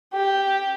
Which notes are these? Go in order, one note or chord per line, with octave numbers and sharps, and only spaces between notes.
G4